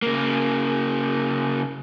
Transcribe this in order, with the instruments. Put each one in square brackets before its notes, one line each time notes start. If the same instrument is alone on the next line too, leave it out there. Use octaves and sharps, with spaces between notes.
[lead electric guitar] C#3 A#3